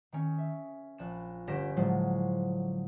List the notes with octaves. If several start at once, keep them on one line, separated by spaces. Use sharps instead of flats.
D#3 C#4
E5
A#1 F#6 E7
G1 C#4 G4 A#6 B6 E7
A2 D3 F3 F#3 G#3